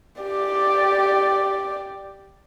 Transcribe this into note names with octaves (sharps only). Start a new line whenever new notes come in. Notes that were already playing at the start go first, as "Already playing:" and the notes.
G4 D5